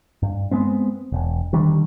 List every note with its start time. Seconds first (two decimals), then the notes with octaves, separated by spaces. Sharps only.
0.22 G2
0.51 G#3 B3 C4
1.12 E1
1.53 D3 D#3 G3